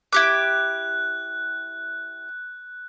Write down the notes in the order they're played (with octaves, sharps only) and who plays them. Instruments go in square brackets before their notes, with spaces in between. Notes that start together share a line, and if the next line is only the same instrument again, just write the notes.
[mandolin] E4 G4 D6 [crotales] F#6